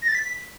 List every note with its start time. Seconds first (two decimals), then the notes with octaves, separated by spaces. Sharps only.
0.02 A#6
0.08 A6
0.15 B6